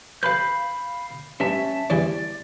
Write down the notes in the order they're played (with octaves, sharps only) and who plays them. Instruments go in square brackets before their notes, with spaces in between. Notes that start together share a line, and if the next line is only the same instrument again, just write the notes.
[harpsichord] A4 B4 [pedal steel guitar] F5 B5 G6
[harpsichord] G2 [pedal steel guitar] C#4 E5 A5
[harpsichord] E2 G2 E3 [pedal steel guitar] D5